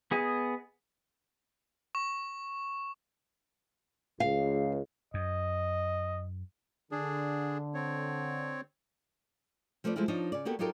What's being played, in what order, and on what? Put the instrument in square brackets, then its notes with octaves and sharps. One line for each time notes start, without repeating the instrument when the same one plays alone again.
[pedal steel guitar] B3 G#4 D#5
[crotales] C#6
[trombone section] C#2 [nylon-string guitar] F5
[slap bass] F#2 [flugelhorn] D#5
[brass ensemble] D3 [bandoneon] D4 G#4
[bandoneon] C4 C#5
[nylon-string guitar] F3 A3 B4 C#5 D5
F3 G#3 A3 E4 F4
F3 D4 D#4 C#5 D#5
C#3 D5
A#3 B3 F#4 G4 A4
F#3 D#4 F4 G4 A4 A#4